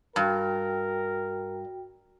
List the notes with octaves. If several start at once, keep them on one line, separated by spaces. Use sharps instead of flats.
G2 F#4 A#4 G5